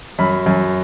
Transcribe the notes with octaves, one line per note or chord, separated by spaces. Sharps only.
F#2 B5
F#2